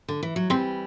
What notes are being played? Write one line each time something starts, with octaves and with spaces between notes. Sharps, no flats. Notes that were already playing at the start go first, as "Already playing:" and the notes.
D3
E3
F#3
E3 G3 C4